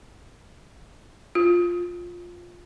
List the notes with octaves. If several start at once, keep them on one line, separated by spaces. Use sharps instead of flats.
F4